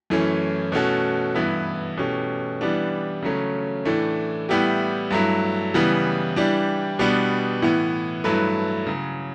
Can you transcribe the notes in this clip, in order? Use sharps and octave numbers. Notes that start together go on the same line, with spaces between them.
F#2 E3 A3 C#4
B2 A3 C#4 F#4 A4
G2 E3 B3 E4
B2 A3 C#4 G4
E3 G3 B3 D4
C#3 F#3 A3 C#4
A2 E3 A3 D4
A2 G3 B3 E4 G4
G2 F#3 A3 E4
C#3 E3 G3 B3
E3 G3 D4 G4
B2 G3 B3 D4
A2 E3 B3
G2 F#3 A3 E4 B4
C#3 F#3